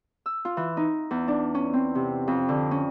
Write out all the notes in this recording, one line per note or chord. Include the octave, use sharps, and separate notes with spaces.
E6
F4
E3
D#4
E2
D4
C#4
C4
C3
F2
D3
C#4